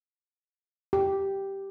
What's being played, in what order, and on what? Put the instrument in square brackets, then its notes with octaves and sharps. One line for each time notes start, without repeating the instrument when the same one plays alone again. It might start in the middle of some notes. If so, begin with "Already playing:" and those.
[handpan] G4